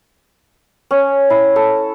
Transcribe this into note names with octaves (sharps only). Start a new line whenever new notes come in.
C#4
E4
A4